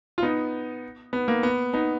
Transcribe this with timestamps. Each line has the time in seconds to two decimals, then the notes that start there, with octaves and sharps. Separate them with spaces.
0.18 F4
0.22 B3 D#4
1.13 B3
1.28 A#3
1.43 B3
1.73 B3 D#4